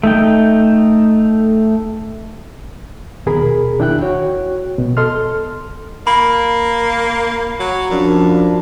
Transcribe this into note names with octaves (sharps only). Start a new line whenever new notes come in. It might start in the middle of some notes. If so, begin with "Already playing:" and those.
A3 D#4 G5
D#2 B2 G#4 A#4 B5
D#2 D4 E4 G5 F#6
F#4 C#5 G5
B2
A4 D#5 C6 F6
A#3 B5
F#3
F#2 F3 D4